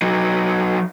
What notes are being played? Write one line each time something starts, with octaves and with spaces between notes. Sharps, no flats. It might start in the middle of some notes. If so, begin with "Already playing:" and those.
F#3 D#4